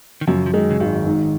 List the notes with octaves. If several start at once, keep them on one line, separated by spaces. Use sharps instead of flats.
D#3
F#2 C#3 F3
F3
D#3 G#3
C#3
G#1 D#3
G#2